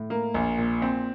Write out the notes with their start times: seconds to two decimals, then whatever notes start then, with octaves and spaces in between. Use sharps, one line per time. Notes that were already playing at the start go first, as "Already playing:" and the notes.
Already playing: A2
0.10 A#3
0.34 A#1
0.58 A#2
0.82 C4